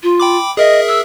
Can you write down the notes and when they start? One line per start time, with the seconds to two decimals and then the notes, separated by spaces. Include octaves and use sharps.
0.03 F4
0.20 G5 B5 D6
0.57 G#4 A#4 D#5 E5
0.88 E6